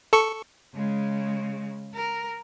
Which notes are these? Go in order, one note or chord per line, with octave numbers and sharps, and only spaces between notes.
A4 C#6
C#3 G#3
A#4